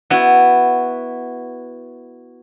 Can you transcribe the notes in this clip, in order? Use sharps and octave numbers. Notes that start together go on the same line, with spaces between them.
B3 E4 F#4